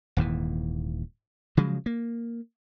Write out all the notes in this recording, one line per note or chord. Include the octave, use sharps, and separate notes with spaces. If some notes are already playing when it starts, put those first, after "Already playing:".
D#1 D#2 G#2 E3
C#3 F3 F#3 G#3
A#3